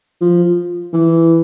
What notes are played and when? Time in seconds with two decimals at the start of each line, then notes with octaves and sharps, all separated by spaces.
0.21 F3
0.93 E3